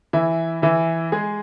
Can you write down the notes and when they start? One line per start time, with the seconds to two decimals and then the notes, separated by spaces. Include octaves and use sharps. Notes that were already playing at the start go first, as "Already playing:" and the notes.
0.13 E3 E4
0.62 E3 E4
1.12 G#3 G#4